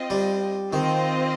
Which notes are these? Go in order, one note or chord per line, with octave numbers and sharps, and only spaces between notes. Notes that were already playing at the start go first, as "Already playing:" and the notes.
Already playing: C4 F4 D#5
G3
D#3 C4 F4 D#5